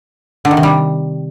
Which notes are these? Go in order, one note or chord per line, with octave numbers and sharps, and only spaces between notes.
D3
D#3
C3
G3